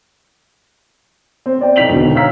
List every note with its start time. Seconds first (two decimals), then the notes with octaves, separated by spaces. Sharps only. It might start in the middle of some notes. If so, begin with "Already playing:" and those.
1.46 C4
1.59 C4 D5 G5
1.76 B1 G5 B6 F7 F#7
1.89 E1 B1 B2 D3
2.15 C#5 F5 A#5 E6 F6 B6